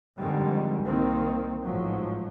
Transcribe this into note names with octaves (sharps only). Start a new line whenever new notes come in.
F2 G#2 D3 D#3 G3 G#3
C2 D#3 A#3 C4
A1 G#2 F3 F#3